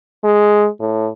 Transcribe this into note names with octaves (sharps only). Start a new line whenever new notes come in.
G#3
A2